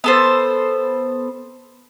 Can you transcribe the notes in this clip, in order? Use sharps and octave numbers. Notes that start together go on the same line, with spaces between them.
B3 A4 C5